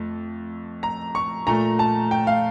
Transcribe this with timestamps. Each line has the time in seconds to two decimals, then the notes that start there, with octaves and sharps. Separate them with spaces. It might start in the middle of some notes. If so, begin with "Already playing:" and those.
Already playing: F2 A3
0.83 A#5
1.15 C#6
1.47 A#2 A3 A#5
1.79 A5
2.11 G5
2.27 F5